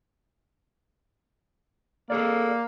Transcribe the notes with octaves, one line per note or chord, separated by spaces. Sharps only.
A#3 G#4 A4 D5